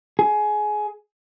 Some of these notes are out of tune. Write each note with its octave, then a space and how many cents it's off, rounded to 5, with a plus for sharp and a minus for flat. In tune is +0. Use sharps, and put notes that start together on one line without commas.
G#4 +20